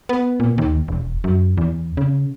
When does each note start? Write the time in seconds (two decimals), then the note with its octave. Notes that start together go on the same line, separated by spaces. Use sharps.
0.09 B3
0.40 A#2
0.58 D#2
0.88 E1
1.24 F#2
1.57 E2
1.97 C#3